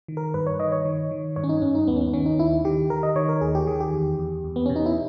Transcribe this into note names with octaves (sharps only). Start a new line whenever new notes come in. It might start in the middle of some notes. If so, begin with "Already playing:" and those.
D#3
A#4
G2 B4
C#5
D#3 D#5
C#5
D#3
D#3
G2 C#5
C#4
D#4
G2 C#4
D#4
D#2 B3
C#4
B3
D#3 C#4
D#4
D#2 E4
D#3 G4
D#3 A#4
D#5
D#3 C#5
A#4
D#2 G#4
G4
D#3 G#4
G4
E2
E2
E2
B3
B2 C#4
D#4
E4